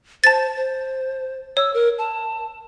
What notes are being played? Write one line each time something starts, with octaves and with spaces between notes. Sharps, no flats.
C5 A5 A6
C5
C#5 E6
A#4
A5